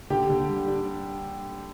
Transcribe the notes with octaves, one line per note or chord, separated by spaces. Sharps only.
D3 G4 G5
D3
G3
D4